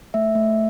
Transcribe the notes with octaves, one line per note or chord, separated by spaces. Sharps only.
A3 E5
A3